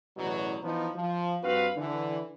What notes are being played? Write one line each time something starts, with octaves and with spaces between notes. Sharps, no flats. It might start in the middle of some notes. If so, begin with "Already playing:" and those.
A1 E2 B2 F#3
E3 F3 B3 D#4
F3
G2 C4 F#4 B4 F5
D3 E3